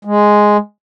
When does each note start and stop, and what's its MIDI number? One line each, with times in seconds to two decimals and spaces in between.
0.05 0.57 56